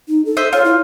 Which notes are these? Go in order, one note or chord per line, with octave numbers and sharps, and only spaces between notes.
D#4
A4
C5 D#5 E5
F4 C#5
E4